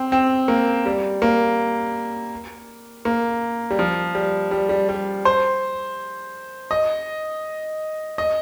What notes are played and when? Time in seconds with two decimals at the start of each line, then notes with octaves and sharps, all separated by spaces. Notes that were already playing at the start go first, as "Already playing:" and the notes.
Already playing: C4
0.12 C4
0.48 A#3
0.86 G3
1.22 A#3
3.05 A#3
3.71 G3
3.79 F3
4.15 G3
4.51 G3
4.69 G3
4.89 G3
5.25 C5
6.71 D#5
8.18 D#5